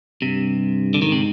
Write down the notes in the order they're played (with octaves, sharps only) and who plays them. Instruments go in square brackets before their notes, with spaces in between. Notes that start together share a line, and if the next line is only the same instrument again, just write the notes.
[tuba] G2 [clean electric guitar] C3
[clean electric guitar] D3
[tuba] G#2 [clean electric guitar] D#3
[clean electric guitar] C3